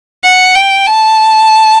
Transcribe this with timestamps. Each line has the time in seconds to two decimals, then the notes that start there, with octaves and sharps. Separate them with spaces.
0.24 F#5
0.56 G5
0.87 A5